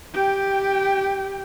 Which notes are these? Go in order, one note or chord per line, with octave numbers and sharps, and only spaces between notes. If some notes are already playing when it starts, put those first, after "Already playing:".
G4 G5